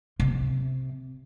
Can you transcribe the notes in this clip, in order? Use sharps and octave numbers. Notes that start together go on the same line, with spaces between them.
C3